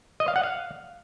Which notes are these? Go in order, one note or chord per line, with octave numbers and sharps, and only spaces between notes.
D#5
F5
F#5
F5